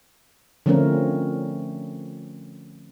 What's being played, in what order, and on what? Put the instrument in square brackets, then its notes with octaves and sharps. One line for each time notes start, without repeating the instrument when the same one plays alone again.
[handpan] D3 F3 A3 C4 C#4 A#4